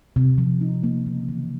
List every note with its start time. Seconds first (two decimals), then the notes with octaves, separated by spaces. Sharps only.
0.16 C3
0.38 F3
0.61 D#4
0.84 A#3
1.06 C#3
1.29 E3